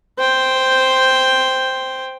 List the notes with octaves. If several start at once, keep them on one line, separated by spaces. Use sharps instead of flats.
C5 G5